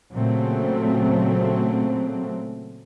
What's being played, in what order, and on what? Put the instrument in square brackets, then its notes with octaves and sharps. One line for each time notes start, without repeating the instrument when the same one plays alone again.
[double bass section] A#2 C#3 F#3 A3 C4